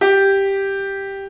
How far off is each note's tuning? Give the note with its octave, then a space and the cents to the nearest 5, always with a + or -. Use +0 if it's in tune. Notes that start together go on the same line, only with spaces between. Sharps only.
G4 +0